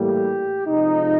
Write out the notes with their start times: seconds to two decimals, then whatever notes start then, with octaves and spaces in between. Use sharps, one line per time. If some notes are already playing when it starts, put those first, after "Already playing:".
Already playing: A2 E3 G3 A#3 G4
0.67 C3 F3 G#3 D#4